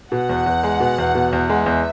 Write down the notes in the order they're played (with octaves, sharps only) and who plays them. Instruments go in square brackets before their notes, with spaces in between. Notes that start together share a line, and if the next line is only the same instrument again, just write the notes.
[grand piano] B2 [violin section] F#5
[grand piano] E2
E2
G#3
B2
E2
B2
E2
[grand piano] G#3 [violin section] E5
[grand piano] E2